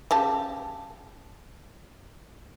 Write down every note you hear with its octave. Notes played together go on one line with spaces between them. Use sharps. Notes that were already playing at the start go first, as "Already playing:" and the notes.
C#3 G4 A5